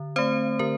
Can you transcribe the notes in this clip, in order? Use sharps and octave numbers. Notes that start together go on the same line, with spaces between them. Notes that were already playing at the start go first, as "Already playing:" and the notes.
Already playing: D3
A3 C4 C5
D3 A#4